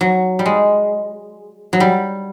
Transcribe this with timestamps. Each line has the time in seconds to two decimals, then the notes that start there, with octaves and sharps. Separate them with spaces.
0.01 F#3
0.39 G3
0.46 G#3
1.73 F#3
1.80 G3